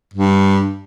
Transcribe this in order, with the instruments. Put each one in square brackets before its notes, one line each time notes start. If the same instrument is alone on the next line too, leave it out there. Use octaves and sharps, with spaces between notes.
[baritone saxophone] G2